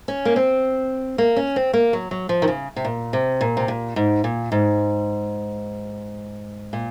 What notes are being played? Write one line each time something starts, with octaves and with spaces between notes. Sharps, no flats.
C#4
A#3
C4
A#3
C#4
C4
A#3
F#3
F#3
F3
D#3
C#3
C3
A#2
C3
A#2
C3
A#2
G#2
A#2
G#2
A#2